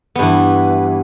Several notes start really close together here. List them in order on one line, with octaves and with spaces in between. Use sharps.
B3 G2 E3